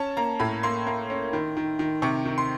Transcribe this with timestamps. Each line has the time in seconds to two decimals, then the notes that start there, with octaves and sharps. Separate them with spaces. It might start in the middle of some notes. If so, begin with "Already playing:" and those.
Already playing: C#4 A5
0.17 A#3 A#5
0.40 A2 B5
0.63 A#3 C6
0.87 A#3
1.10 C#4
1.33 D#3
1.57 D#3
1.79 D#3
2.02 C3 C#6
2.25 D#3
2.38 C6